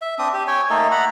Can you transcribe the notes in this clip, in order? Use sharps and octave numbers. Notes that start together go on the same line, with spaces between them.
E5
C4 D4 D#6
G4
C#5 G5 G#5
A3 A#3 D#4 A4
F#5 A#5 B5